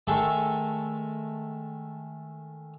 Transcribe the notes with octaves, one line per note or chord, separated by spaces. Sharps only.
D#3 G#3 A3 A4 C6 C#6